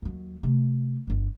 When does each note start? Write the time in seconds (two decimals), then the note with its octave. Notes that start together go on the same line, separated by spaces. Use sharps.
0.02 D#2 F#3
0.43 C3 A3
1.07 G1 F2